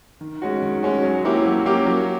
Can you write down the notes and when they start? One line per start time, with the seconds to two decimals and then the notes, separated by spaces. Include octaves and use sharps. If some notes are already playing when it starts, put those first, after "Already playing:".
0.21 D#3
0.42 G#3 C#4 F#4
0.62 D#3
0.83 G#3 C#4 F#4
1.03 F#3
1.25 A#3 C#4 E4 G4
1.45 F#3
1.66 A#3 C#4 E4 G4
1.86 F#3